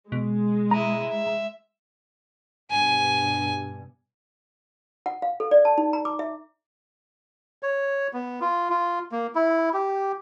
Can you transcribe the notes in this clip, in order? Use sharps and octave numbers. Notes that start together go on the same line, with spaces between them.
B2 G#3
E4 D#5 A#5
E5
G2 B2 G#5
F#5
F5
A4
D5
A5
D#4
A#5
D6
E5
C#5
B3
F4
F4
A#3
E4
G4